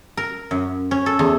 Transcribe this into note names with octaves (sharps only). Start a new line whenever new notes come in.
A#4
F#2
C#4
A4
E2